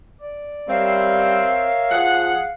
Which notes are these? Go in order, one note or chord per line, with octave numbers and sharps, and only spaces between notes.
D5
G3 C4 A#4 C#5 E5 F5
F3 G#4 F#5